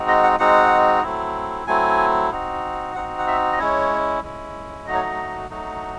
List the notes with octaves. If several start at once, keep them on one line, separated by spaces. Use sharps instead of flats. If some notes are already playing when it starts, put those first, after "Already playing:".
Already playing: G#3 C4 D#4 F#4
D#5
F#5
G#3 C4 D#4 F#4 F#5
F#3 A3 C4 E4
F#3 A3 C4 E4 G#5
C4 D#4 F#4
C4 D#4 F#4 F#5
F#5
E5
D#5
G#3 C#4 E4 C#5
G#3 C#4 E4
F#3 A3 D#4 F#4 D#5
C#5
D#5
F#3 A3 D#4 F#4